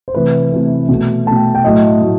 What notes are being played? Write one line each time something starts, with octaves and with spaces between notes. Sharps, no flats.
C5
C3 E3 A3 B4
C3 E3 A3
B2 A3
B2 A3 A5
G5
G5
A2 F#3 A3 D#5
A2 F#3